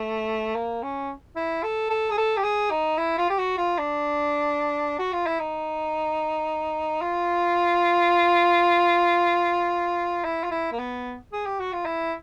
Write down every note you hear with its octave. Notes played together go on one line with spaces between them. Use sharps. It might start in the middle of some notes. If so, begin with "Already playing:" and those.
Already playing: A3
A#3
C#4
E4
A4
A4
G#4
A4
G4
G#4
D#4
E4
F4
G4
F#4
F4
D4
F#4
F4
E4
D#4
F4
E4
F4
E4
A#3
B3
G#4
G4
F#4
F4
E4